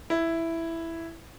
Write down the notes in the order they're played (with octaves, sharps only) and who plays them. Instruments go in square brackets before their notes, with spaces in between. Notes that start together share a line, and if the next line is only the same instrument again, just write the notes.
[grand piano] E4